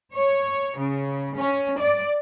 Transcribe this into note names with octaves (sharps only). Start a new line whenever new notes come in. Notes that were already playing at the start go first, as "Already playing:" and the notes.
C#5
C#3
C#4
D5